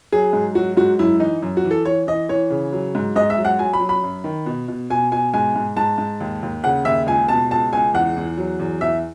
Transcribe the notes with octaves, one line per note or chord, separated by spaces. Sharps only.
F#3 G#4
G#2
F#3 F#4
G#2 F#4
F#2 E4
E3 D#4
F#2
F#4
E3
A4
E3 C#5
E3 D#5
E3 C#5
C#3
F#3
G#2
G#2 D#5
E5
F#3
F#5
F#3 G#5
B5
F#3
B5
F#2
D#3
B2
B2
B2 G#5
B2 G#5
G#2 G#5
G#2
G#2 A5
G#2
D#2
D#2
C#3 F#5
D#2 E5
C#2 G#5
B2 A5
C#2 A5
C#2 G#5
E2 F#5
E2
F#3
E2
E2 E5